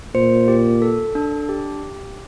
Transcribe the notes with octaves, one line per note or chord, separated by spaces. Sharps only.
A#2 C5
G4
A4
D4
G4